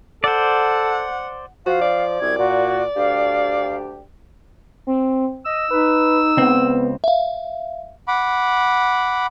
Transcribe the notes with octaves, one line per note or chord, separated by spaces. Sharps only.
A4 C5 D5 F#5
F3 F#4 F5
D5
C2 F#2 G#6
A#2 F#4
D2 D4 G4 F5
C4
D#5 E6
D#4 B4
C#2 B3 C4
E5 F5
F#5 B5 D6